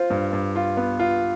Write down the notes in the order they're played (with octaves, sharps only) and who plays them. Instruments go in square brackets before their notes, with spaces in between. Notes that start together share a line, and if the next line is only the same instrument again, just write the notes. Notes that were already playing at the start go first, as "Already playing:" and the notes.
Already playing: [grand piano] F4 [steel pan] C5
[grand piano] G2
G2
F4
B3
F4